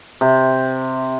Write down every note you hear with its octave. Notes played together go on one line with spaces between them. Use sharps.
C3